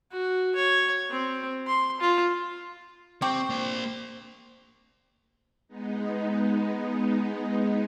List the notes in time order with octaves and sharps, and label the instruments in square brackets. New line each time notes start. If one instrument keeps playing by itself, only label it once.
[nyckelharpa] F#4
C#5
C4
C6
F4
[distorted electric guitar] C4 [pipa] G4 C#6
[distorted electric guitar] A#3 C5
[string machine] G#3 B3 D#4